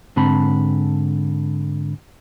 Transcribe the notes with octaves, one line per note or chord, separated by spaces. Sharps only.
G#2 D3 C4 A5 B5